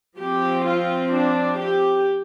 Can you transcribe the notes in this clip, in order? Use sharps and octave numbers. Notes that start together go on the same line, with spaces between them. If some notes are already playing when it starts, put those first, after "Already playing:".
F3 C4 G4
F4
D4
G4